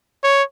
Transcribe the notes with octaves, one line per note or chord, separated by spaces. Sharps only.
C#5